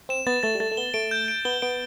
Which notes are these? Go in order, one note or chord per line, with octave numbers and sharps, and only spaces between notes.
C4 E7
B3 A6
A3 A6
G3
A3 A6
A3
B3 G7
A3 D7
G6
D7
B3 G7
B3 D7